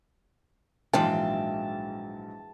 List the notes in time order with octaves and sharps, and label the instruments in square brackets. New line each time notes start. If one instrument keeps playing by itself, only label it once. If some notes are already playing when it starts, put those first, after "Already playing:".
[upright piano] A#1 G#2 F#3 [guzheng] E3 G#3 F4 [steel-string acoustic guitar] G5 [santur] A5